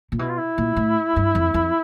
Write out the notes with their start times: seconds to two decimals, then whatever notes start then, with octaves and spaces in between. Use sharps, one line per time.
0.12 A#2
0.19 B2 E4
0.29 F4
0.38 E4
0.58 A#2
0.77 A2
1.16 G2
1.35 F2
1.54 F2